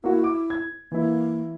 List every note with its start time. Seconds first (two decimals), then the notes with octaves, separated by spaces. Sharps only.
0.04 A#3 E4 F#4
0.24 D6
0.50 G#6
0.92 E3 A#3 E4